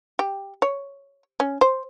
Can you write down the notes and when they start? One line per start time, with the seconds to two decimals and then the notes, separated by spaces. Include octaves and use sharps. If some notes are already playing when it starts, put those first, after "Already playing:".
0.19 G4
0.62 C#5
1.40 C#4
1.61 C5